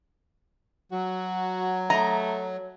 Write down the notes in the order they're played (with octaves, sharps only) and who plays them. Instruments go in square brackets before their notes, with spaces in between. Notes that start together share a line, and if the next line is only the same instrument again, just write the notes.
[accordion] F#3 [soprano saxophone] F#4
[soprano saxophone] A3 [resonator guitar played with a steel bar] D#5 A#5